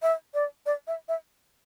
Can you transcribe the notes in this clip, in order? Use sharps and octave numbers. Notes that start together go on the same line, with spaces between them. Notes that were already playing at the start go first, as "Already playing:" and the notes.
E5
D5
D5
E5
E5